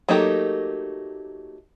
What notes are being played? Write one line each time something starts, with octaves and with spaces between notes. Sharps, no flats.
F#3 A3 A#3 D#4 G4